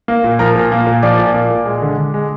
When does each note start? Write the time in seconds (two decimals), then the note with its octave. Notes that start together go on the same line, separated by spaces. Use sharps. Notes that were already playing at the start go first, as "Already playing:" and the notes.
0.08 A#3
0.24 A#2
0.39 F3 A#4 A#5
0.56 A#2
0.72 A#3
0.87 A#2
1.03 F3 D5 D6
1.19 A#2
1.34 A#3
1.50 A#2
1.66 G#3
1.82 D3
1.98 D3
2.14 G#3